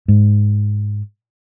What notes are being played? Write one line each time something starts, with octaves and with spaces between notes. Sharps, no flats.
G#2